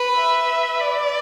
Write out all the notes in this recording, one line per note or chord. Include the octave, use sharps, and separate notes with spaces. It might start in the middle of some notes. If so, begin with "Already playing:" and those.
Already playing: B4
E5
D5